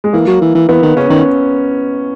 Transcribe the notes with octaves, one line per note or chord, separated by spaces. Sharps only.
G#3
E3 A#3
F#3
E3
E3
E3 B3
D#3
C#3 C#4
D#3